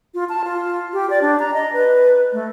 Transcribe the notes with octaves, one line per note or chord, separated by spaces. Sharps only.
F4
A5
F4
G4
D5
D4
A#5
D#5
B4
A3